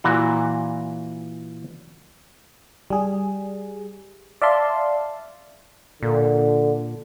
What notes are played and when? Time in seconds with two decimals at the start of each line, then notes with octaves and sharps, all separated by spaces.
0.04 A#2 E3 F#4 F#5
2.90 G3 G#4
4.42 D5 E5 F5 A5 C6
6.03 A#2 D3